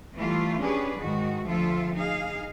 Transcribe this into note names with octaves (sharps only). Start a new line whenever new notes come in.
E3 G3 A3 F4
C#4 D4 G4 G#4 B4
G#2 D#3 F#4
D2 F3 F4 A4 E5
D#4 G#4 F5